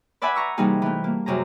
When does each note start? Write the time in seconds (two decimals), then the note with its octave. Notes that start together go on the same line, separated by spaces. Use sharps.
0.22 B4 D5 E5 F#5 G#5 B5
0.35 A#5 C#6 E6
0.57 C3 E3 G3 A#3 D#4 G#4
0.82 E3 A3
1.04 A#3
1.26 F#2 C3 G#4 A#5